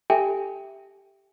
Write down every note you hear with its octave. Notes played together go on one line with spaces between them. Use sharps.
G4 A4 E5 G5 G#5